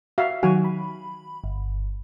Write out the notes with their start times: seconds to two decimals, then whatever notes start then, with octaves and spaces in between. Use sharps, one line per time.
0.18 F#4 E5 F5
0.43 D#3 F#3 F#4 G#5
0.64 B5
1.44 G1